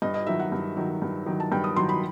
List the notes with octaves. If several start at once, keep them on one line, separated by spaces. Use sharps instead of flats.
G2 D#5
D#5
D#3 F#3 E5
F#5
G2
D#3 F#3
G2
D#3 F#3
A5
G2 G5
D#6
D#3 F#3 C6
B5